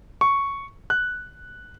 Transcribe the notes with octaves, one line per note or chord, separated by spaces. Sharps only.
C#6
F#6